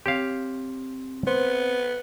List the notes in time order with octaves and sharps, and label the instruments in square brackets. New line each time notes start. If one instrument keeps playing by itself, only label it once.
[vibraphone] C4 [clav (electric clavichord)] G4 C#5 F5
[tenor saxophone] B3 [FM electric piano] C5